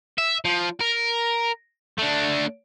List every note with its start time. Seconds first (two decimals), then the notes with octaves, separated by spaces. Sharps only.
0.18 E5
0.45 F3
0.81 A#4
1.98 A3 D4